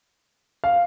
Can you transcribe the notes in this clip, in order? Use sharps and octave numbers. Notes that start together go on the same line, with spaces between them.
F5